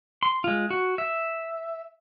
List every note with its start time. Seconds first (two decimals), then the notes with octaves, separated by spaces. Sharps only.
0.23 C6
0.44 G#3 F4
0.70 F#4
0.98 E5